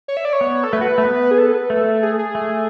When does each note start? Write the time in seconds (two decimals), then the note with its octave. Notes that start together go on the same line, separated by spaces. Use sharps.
0.08 C#5
0.17 E5
0.25 D5
0.33 C#5
0.41 B3
0.63 A4
0.73 A3 B4
0.81 F#4
0.98 A3
1.05 B3
1.31 G#4
1.38 A4
1.54 B4
1.70 A3 A4
2.03 G#4
2.19 G#4
2.35 A3